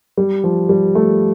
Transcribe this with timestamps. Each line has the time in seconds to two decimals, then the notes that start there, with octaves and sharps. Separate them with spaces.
0.17 G3
0.44 F3
0.69 G3
0.95 A3